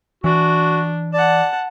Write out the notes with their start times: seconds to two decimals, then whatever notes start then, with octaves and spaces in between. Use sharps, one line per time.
0.24 E3 D4 F#4
1.13 D5 F#5 A5